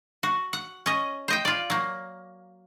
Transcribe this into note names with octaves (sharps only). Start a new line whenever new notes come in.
F#4
F#5
C#4 D#5
C5 D#5 G5
F4 D5
F#3 A#3